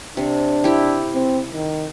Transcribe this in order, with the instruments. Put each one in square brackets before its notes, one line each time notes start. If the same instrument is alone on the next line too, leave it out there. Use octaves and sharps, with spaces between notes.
[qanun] C3 [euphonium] D4
[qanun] E4 G4
[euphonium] C4
D#3